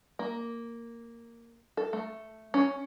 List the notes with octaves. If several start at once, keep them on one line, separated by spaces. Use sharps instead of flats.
A#3
A4
A3
C#4